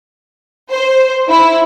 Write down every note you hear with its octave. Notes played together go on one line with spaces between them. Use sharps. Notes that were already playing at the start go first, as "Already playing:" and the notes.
C5
E4